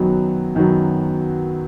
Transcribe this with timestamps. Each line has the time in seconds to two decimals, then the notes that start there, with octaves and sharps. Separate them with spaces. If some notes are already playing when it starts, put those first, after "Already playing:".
Already playing: F#2 D#3 F#3 B3 F#4
0.55 F#2 D#3 F#3 B3 F#4